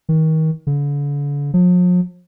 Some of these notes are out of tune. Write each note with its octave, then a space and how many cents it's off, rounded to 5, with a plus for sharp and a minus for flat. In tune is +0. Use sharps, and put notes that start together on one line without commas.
D#3 +30
D3 -40
F3 +45